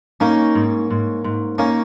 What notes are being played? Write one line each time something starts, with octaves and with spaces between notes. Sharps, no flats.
A#3 C#4 D#4
G#2
G#2
G#2
A#3 C#4 D#4